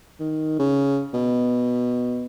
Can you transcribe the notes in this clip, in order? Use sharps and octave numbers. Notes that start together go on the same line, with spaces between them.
D#3
C#3
B2